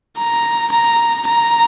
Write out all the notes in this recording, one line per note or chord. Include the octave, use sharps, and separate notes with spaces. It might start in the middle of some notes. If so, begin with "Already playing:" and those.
A#5
A#5
A#5